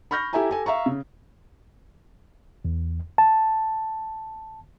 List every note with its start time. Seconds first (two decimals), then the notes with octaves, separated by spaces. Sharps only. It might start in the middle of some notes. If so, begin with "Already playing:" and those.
0.11 B5 C#6 F6 G6 A#6
0.33 E4 G4 A4 E5 G#5 A#5
0.50 G4 A4 G#5
0.66 E5 F5 A#5 C#6
0.86 C#3
2.65 E2
3.18 A5